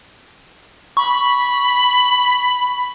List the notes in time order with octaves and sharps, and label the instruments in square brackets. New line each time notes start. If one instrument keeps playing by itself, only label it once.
[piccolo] B5 [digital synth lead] C#6